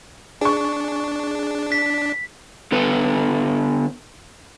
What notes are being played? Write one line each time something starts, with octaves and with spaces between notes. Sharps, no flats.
D4 G#4 C#6
B6
D3 B3 A4 B4